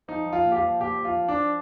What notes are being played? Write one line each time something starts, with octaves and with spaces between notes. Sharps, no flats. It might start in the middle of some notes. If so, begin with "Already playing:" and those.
F3 D#4
F3
F4
A#2
G4
F4
F3
A#2 G4
F3
F4
F3
D4
F3